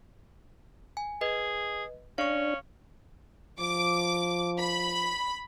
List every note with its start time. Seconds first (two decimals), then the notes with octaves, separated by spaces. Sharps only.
0.97 G#5
1.21 G#4 B4 D#5
2.18 C#4 D4 F5 C#6
3.60 F3 D6
4.59 B5